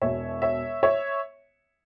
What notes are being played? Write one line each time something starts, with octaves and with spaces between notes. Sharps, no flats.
E1 E2 B2 C#5 E5
C#5 E5
C#5 E5